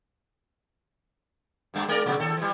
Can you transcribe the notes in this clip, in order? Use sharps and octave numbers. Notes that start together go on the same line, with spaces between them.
G2 G3 A3
G#3 A#4 D5
A#2 C#3 F#3
D#2 A4
E3 G3